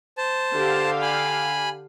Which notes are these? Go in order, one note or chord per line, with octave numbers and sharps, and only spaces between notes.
C5 A5
D3 G4 F5
G#5 B5